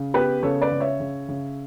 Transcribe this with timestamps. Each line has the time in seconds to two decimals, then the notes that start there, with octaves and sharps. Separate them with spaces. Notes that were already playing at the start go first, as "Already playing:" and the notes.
Already playing: C#3
0.14 B3 G4 B4
0.43 C#3 A4 C#5
0.62 B4 D5
0.71 C#3
0.80 C#5 E5
1.00 C#3
1.28 C#3